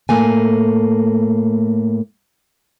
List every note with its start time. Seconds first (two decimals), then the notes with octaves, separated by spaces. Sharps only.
0.09 A2 A3 A#3 G#5